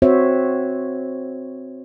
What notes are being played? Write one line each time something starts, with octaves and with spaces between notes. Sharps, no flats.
C4 F#4 C5 C#5 E5